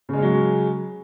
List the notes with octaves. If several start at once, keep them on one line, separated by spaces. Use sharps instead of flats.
C#3 F#3 G#3 C#4